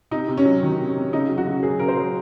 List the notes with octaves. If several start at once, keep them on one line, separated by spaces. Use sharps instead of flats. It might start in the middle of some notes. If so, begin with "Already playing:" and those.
C3 D#4
C3
C#4
F#3
D#3
C3
C3
C#3 D#4
F#3
F#4
C#3
F#3 G#4
C#3 A#4
C5
F#3